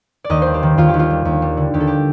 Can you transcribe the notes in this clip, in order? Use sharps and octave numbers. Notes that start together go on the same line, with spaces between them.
D5
D#2 D#5
G3 C5
G4
D#3
D#2 F4
G4
D#2
F4
G3
D#2
G3
D3
D#2 G4
A4
G4